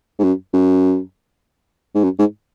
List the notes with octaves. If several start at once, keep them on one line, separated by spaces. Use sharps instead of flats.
G#2
F#2
F#2
G#2
F#2
G#2